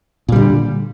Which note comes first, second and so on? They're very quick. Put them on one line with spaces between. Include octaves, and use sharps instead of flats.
A#2 G3 D3